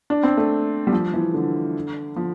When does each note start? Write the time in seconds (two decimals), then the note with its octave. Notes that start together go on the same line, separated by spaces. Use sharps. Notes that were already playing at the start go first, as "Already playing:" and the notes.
0.10 D4
0.23 C4
0.37 A3
0.87 G3
0.92 F3
1.14 E3
1.34 D3
2.16 F3